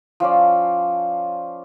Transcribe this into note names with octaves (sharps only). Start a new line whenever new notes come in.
F3 C#4 D5